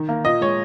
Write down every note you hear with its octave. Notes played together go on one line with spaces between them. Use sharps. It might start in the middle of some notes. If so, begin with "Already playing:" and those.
Already playing: D#3
A#3
A#2 D#5
G#3 C#5